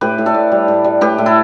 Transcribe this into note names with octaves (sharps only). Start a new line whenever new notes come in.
A2 G4 B4
A2
A4 D5
A2
G3
A2
G3
A2 G4 B4
A2
E4 A4